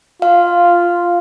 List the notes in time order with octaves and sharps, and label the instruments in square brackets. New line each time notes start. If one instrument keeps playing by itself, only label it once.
[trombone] F4 [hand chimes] F5